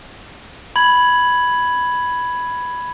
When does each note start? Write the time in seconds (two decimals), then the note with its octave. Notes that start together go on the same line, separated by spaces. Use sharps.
0.76 B5 G#6 F#7